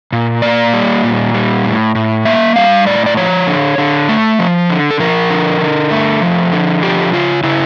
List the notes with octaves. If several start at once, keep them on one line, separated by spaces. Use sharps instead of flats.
A#2
A#3 D5
G3
A#2
G3
A2
A2
A#3 E5
G3 F5
A2 D5
D5
F3 C#5
D3
D3
A3
F3
D3
A4
F3 A#4
D3
D3
A3
F3
D3
F3 G4
C#3 F4
C#3 E4